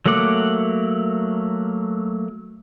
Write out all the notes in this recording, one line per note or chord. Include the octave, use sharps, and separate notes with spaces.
F#3 A3 A#3 F#5 D6